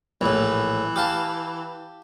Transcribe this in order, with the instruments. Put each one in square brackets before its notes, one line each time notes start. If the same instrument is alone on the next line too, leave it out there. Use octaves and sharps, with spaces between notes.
[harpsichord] A#1 A2 [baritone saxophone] E3
[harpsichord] G4 F5 A5